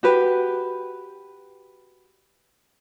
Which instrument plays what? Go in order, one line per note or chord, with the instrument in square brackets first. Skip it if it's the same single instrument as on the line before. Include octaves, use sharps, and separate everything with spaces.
[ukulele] F#4 G4 B4